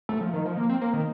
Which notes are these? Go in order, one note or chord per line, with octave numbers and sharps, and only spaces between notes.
A3
F3
D#3
F3
A#3
C4
A#3
D#3